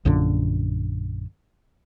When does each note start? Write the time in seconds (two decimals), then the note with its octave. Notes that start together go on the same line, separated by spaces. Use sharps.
0.05 A#1 F#2 A#2 D3